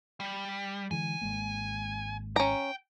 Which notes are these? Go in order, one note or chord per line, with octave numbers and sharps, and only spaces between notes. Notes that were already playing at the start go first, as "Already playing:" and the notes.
G3
D3 E3 G#3 G#5
G#1 G#3 A#3
C#4 G5 A#5